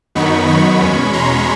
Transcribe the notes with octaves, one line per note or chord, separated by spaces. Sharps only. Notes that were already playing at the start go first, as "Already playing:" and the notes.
F#2 D#3 F#3 B3 D#4 B5 C#6
B5 C#6
E2 B2 G#3 C#4
A#5 C6